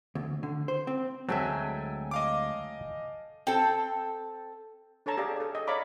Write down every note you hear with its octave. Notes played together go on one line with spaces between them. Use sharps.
D2
D3
C5
C4
D2 F#3 G#3 C4 A4 E5 G5 G#5
D#5 F5 D6
C4 A4 G5
D4 A4 C#5 A5 A#5
G4 G#4 D5 F5
A4 D5
D#5
C#5 D5 F5 A#5 B5 D6